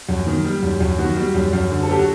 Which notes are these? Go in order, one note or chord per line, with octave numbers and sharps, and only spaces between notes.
F#2
D#3
G3
F#2
F#2
D#3 F#4
G3
F#2
F#2
D3
A4
F#3 G4
F#4